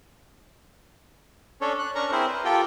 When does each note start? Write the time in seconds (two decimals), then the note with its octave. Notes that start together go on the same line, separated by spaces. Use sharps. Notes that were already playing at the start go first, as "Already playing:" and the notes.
1.61 C#4 D4 A4 C#5
1.79 F#6
1.95 C#4 D4 A#4 A#5 C#6
2.12 C4 E4 G#4 A#4 C5
2.27 B4
2.45 F4 G4 A4 A#4 G5